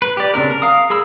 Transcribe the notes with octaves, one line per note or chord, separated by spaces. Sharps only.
B4
G4 D5
C#3 C4 D4 A#4
A#4
F5 A#5 D#6
G#4 A#4 B5 E6